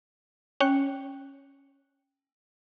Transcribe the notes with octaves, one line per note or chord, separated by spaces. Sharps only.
C#4 G5 F#6 C#7